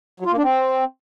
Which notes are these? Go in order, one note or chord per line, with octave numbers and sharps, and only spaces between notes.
F#3
F4
A#3
D4
C4